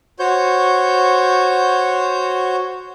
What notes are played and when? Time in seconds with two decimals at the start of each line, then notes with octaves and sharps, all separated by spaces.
0.19 F#4 C5 C#5 G6